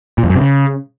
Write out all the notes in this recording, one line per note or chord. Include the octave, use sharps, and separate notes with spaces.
A#2
F2
F#2
C3
C#3